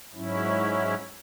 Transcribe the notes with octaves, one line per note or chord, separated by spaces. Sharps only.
G#2 F#3 C#4 E4